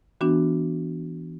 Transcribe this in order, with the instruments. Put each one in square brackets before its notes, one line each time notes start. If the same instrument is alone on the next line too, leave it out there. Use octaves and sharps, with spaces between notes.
[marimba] E3 B3 D4 F#4